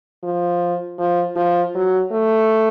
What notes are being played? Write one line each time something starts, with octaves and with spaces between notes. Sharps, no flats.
F3
F3
F3
F#3
A3